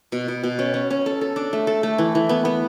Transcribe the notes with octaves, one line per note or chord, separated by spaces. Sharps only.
B2
B2
B2
C#4
C#4
C#4
A4
A4
D4
A3
A4
A3
E3
E3
B3
B3